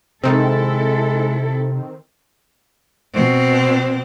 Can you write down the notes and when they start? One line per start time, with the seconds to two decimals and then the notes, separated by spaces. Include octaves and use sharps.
0.24 C3 D#3 G#3 C4 E4 A4
3.14 B2 C4